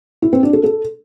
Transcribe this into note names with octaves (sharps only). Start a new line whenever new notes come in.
E4
C4
D4
A4
A4